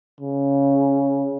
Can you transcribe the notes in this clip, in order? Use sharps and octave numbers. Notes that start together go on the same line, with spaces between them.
C#3